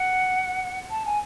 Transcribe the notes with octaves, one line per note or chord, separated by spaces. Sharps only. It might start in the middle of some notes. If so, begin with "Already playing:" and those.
Already playing: F#5
A5
G#5